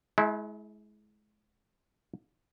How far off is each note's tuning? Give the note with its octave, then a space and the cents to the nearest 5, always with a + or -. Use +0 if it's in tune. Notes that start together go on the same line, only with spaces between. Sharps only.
G#3 +30 E4 -15